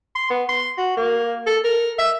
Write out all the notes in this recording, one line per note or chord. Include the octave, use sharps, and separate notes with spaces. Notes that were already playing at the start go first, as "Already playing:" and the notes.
C6
B3
C6
F#4
A#3
A4
A#4
E5